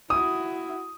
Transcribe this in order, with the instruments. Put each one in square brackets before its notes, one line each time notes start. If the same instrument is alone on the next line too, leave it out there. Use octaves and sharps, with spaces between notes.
[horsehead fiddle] E4 F#4 [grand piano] D#6